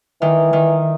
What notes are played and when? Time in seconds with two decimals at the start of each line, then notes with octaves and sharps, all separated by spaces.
0.21 D#3 E3
0.53 D#3